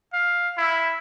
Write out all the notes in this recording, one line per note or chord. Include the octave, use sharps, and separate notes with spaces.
F5
E4